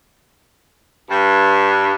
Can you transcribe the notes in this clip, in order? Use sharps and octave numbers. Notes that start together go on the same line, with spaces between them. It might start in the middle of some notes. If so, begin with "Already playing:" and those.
G2